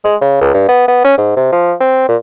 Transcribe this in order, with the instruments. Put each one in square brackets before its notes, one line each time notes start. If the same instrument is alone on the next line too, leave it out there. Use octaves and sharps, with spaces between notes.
[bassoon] G#3
C#3
C#2
G2
B3
B3
C#4
G#2
C3
F3
C4
A#2